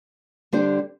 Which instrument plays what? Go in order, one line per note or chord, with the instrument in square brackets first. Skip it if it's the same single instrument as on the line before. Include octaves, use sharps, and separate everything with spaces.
[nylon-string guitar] D3 G3 D4 G4 C5